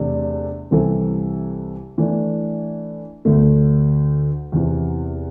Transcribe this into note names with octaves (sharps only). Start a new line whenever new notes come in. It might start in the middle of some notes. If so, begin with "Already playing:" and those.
Already playing: E2 C3 A3 D4
C2 C3 E3 C4 A4
E3 A3 D4
D2 D3 A3
E2 C3 E3